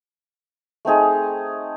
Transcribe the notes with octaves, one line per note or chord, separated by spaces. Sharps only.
A3 C4 D#4 G#4